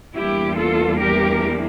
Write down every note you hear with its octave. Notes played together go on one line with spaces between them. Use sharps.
E2 E3 G3 A#3 D4 E4 G4
F4 A4
G4 A#4